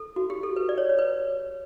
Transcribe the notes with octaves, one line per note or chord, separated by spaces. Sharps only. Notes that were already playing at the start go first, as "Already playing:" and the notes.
Already playing: A4
F#4
G4
A4
B4
D5
C#5
C#5
B4